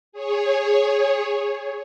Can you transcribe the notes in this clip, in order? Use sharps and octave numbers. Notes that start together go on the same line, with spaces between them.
G#4 C#5